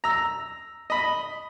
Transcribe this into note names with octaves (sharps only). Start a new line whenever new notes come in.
A#5 E6
D#5 B5